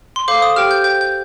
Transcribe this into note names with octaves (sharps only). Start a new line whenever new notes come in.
C6
A4 C5 F5 D6
D#6
G4 C5 G5 F6
G6
C5 G5 G6
G6